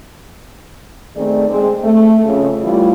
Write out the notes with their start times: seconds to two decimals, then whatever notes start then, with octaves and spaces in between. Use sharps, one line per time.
1.16 D#3 A3 C4 G#4 D5
1.50 G#3 C4
1.84 A3
2.26 F2 C#3
2.64 E3 G3 A3 E4 F4